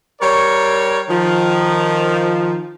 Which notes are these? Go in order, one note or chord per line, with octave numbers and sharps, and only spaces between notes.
G3 A#4 C#5
D#3 F3